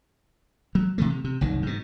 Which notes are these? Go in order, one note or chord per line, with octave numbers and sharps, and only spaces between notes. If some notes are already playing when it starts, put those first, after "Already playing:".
F#3
C3 E3 A3
C3
C3
F#1 C2 D#3
G#2 B2